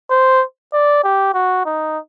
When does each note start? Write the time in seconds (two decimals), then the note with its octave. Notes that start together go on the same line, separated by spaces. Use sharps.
0.10 C5
0.73 D5
1.04 G4
1.34 F#4
1.66 D#4